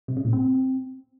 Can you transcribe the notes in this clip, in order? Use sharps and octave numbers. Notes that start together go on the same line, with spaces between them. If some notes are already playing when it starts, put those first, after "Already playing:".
C3
C#3
A#2
C4